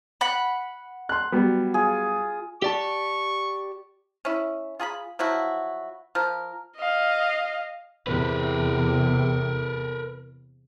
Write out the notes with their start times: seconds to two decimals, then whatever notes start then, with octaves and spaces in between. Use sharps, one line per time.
0.21 F#5 B5
1.09 C6 F#6
1.32 F#3 G3 B3
1.74 F4 G#4
2.62 G4 D5 A5 C#6
4.25 C#4 E4
4.79 F4 G#4 A#5 B5
5.19 F3 F#3 E4 F#4
6.15 F3 A#4
6.77 D#5 F5
8.07 E2 C3 A#4 B4